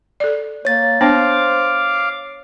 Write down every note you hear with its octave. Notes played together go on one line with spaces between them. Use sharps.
A4 D5
A#3 C#5 A6
B3 D4 C5 F5 G5 D6